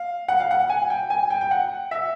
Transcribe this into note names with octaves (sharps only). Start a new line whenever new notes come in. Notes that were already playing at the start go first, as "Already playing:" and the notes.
Already playing: F5
F#5
F5
F#5
G#5
G5
G#5
G5
G5
F#5
E5